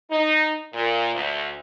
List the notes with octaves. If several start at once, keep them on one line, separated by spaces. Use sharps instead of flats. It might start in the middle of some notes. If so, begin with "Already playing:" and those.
D#4
A#2
D2